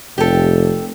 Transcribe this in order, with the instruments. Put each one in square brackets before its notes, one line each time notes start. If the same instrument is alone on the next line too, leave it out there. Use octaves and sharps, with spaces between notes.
[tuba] F1 [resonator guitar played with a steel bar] G4 A4